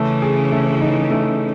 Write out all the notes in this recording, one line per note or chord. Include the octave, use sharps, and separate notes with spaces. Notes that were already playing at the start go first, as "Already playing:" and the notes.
Already playing: C#3 E3 A3
G#4
A3
D#4
A3